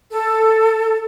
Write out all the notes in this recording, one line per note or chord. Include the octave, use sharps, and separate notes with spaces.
A4